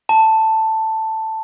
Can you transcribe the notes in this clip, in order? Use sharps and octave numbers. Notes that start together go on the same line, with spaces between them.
A5